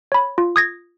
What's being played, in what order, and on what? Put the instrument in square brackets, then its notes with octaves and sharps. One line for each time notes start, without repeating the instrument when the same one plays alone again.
[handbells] C#5 B5
F4
D#6 G#6 A#6